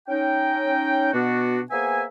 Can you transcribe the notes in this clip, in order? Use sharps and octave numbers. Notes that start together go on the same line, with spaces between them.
C#4 D#4 G5
B2 B3 D4 F#4
A#3 B3 G#4 C5 E5 G#5